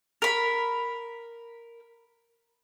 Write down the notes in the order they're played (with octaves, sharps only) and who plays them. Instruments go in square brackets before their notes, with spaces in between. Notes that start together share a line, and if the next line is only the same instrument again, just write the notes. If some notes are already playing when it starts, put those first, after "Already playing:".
[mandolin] A#4 B5